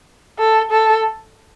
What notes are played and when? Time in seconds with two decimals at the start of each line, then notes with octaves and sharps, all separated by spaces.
0.39 A4
0.71 A4